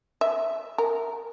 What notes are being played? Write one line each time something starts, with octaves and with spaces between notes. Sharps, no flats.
E5
A#4